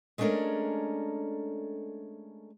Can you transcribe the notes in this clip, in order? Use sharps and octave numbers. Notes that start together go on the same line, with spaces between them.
G#3 A3 C#4 D4 A4 A#4